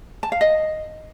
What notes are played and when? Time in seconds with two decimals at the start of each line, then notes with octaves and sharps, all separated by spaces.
0.23 A5
0.32 F5
0.41 D#5